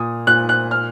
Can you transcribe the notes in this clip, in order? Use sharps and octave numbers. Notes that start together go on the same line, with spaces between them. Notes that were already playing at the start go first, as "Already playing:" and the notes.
Already playing: A#2 D#6
A#2 F#6
F#6
F6